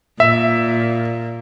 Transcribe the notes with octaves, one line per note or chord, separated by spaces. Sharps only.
A#2 E5